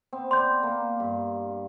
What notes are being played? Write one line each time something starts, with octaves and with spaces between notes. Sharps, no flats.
B3 C4
D5 C6 G6
A#3
G2